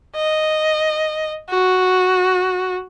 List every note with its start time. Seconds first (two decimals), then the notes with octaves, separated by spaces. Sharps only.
0.16 D#5
1.50 F#4